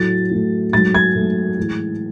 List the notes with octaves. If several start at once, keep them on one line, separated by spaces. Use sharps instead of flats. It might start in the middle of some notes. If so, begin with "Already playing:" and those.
Already playing: A2 F#3 A3 A6
A2 F#3 A3
G#2 F#3 A3 A6
G#6
G#2 F#3 A3
A2 E3 G#3